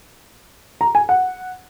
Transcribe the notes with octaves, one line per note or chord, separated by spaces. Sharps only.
A#5
G#5
F#5